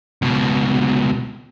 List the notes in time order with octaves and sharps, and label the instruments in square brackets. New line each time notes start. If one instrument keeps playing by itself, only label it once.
[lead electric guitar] C#2 B2